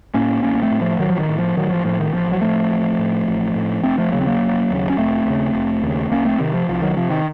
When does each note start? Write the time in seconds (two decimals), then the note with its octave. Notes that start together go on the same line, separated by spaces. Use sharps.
0.14 A2 A#3 C#4
0.43 A1 A#3 C#4
0.55 A#3
0.62 A3 C4
0.71 A2
0.81 F3 A3
0.99 A1 D#3 F#3
1.10 F3
1.19 D#3
1.29 A2
1.39 F3
1.57 A1 D#3 F#3
1.71 F3
1.85 A2 F3
2.00 D#3
2.13 A1 F3
2.32 F#3
2.42 A2 F3 A3
2.70 A1
2.99 A2
3.28 A1
3.55 A2
3.83 F1 A3 C4
3.98 F3 A3
4.12 D#2 C#3 F#3 A#3
4.21 C4
4.27 F#3 A#3
4.40 F1
4.70 D#2 C#3
4.90 C#4
4.97 F1 A3 C4
5.26 D#2 C#3
5.55 F1
5.82 D#2 C#3
6.11 C2 A#3 C#4
6.25 A3 C4
6.39 C3 D#3
6.54 F3
6.68 C2 F3
6.82 D#3 F#3
6.97 C3 F3
7.10 D#3